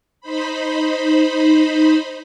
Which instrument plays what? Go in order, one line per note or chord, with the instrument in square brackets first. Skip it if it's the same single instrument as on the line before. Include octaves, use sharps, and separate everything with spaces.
[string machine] D#4 C5 B5